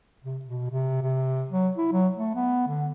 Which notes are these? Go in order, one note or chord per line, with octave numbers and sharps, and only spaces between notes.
C3
B2
C3
C3
F#3
E4
F#3
A3
B3
D3